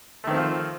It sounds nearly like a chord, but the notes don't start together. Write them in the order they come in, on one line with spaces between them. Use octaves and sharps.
A3 D#3 C4 F3 F4